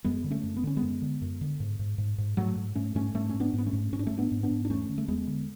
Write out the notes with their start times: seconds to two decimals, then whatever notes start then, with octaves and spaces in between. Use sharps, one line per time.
0.04 F#2 G#3 B3
0.24 D3
0.30 A3 C#4
0.43 F#2
0.57 B3
0.63 D3 C#4
0.77 G#3 B3
0.82 F#2
1.02 D3
1.22 F#2
1.41 D3
1.60 G#2
1.79 G#2
1.98 G#2
2.18 G#2
2.37 G#2 F#3 A3
2.56 G#2
2.75 G#2 A3 C#4
2.95 G#2 A3 C#4
3.14 G#2 A3 C#4
3.29 G#2 C#4
3.40 B3 D4
3.54 G#2 B3
3.66 A3 C#4
3.73 G#2
3.92 G#2 C#4
3.99 D4
4.07 G#2 A3 C#4
4.18 B3 D4
4.31 G#2
4.43 B3 D4
4.51 G#2
4.65 D4
4.70 E2 A3 C#4
4.89 D3
4.98 A3
5.08 E2 G#3 B3
5.27 D3